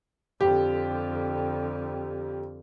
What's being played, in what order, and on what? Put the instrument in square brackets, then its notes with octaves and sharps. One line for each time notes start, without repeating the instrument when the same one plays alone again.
[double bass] F2 D3 [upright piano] G4